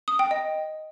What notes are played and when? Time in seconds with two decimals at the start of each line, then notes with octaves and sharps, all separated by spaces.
0.08 D#6
0.19 G5
0.31 D#5